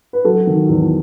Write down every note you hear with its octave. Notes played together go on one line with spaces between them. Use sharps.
B4
F#3 F#4 A4
D#3
E2